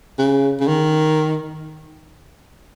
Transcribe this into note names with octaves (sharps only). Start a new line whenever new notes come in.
C#3
C#3
D#3